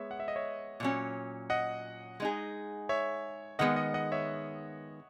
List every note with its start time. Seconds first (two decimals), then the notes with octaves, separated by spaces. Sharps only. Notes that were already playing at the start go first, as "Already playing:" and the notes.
Already playing: G#3 B3 C#5 E5
0.11 F#5
0.20 E5
0.28 D#5
0.36 C#5 E5
0.80 A#2 F#3 C#4
1.50 D#5 F#5
2.20 G#3 D#4 G#4
2.89 C#5 E5
3.59 D#3 G#3 B3 D#5 F#5
3.76 D#5 F#5
3.94 D#5 F#5
4.12 C#5 E5